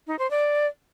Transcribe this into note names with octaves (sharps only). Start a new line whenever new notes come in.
D#4
C5
D5